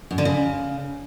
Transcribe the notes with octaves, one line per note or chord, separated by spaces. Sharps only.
F#2
D3
C#3